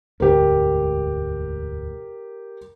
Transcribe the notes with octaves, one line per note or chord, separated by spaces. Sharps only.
E1 D2 G#2 G4 A#4